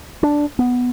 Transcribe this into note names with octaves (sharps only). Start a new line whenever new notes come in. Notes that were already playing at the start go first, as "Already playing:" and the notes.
D4
B3